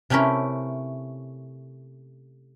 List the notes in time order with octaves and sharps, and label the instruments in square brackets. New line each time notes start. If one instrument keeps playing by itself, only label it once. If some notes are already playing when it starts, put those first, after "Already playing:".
[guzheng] C3 A3 C#4 E4 A#4